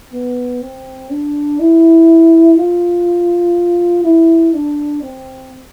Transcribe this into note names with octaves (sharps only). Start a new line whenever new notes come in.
B3
C4
D4
E4
F4
E4
D4
C4